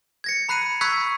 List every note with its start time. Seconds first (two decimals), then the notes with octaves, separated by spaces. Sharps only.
0.24 G#6 A#6 C#7
0.49 A#5 B5 F#6 C7 D#7
0.81 B5 C#6 E6 F#6 G#6 B6